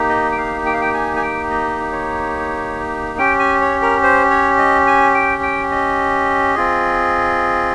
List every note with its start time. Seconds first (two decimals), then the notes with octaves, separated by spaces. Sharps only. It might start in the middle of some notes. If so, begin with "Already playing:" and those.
Already playing: A#3 D#4 G4
0.09 D#5
0.32 G5
0.37 F5
0.66 G5
0.73 F5
0.81 G5
0.94 G#5
1.16 G#5
1.22 G5
1.51 D#5
1.92 C#5
3.18 C#4 G4 G5
3.39 G#5
3.61 C#5
3.82 A#4
4.03 C5
4.30 C#5
4.58 D#5
4.87 G#5
5.15 G5
5.43 G5
5.72 D#5
6.55 C4 F4 G#4